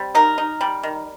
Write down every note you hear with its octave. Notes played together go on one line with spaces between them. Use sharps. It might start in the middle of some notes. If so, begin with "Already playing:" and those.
Already playing: G3 C4
D#4 A#4
D#4
G3
D#3